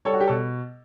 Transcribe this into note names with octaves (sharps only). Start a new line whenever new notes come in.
G3 A4 C#5
F#4
G4
B2 A4